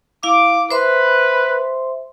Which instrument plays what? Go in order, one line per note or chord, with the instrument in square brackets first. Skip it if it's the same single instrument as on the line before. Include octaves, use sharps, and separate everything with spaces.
[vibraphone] E4 F5 [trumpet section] D6
[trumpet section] B4 [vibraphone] C5 E5 C6